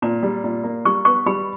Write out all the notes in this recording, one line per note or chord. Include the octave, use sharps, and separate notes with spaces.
A#2 A#5
G3
A#2
A#3
G3 C#6
B3 C#6
G3 B5